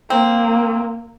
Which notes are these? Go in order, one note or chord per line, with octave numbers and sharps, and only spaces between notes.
A#3 C4